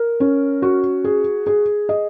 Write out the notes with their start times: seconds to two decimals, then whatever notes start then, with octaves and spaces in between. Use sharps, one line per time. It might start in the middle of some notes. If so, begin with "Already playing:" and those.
Already playing: A#4
0.20 C#4
0.62 F#4
1.04 G#4
1.47 G#4
1.89 D#5